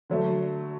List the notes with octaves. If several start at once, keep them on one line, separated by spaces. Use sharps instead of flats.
D3 F#3 A3